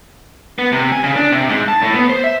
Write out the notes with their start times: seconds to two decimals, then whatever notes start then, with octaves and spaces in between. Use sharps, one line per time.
0.59 B3
0.72 C3
0.92 G#5
1.04 C#3
1.16 D4
1.32 C3
1.49 G#2
1.68 A5
1.83 A2
1.95 B3
2.10 C5
2.24 E5